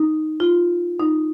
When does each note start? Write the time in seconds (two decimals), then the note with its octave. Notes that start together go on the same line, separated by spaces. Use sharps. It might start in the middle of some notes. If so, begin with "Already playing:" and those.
Already playing: D#4
0.40 F4
1.00 D#4